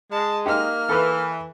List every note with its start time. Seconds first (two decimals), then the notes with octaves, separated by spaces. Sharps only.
0.12 G#3 A5
0.46 A#3 D#4 G4 F6
0.89 E3 A4 B4